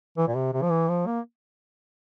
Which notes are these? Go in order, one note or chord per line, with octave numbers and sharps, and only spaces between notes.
E3
A#2
C3
C3
F3
E3
F3
A#3